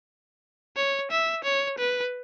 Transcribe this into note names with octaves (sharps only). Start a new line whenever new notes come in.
C#5
E5
C#5
B4